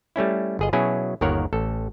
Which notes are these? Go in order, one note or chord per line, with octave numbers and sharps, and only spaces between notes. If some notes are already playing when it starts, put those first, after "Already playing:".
G3 A3 C#4 E4
G1 G#4 D#5
B2 F#3 C#4 E4 G#4
G1 D#2 D#3 A#4 C#5 F#5
A1 A4